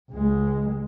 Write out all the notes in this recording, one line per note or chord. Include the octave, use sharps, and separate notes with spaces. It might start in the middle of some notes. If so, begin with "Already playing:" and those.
C#2 G#3